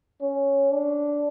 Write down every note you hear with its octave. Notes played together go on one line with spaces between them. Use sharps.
C#4
D4